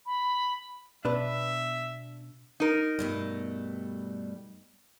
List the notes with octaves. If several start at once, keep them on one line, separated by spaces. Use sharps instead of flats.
B5
B2 D4 B4 E5
D#4 A#4
G2 B2 G3 A3